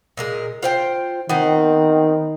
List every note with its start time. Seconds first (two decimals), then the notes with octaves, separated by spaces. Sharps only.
0.17 A#2 G#3 A#4
0.63 F4 C5 G5
1.29 D#3 B3 C4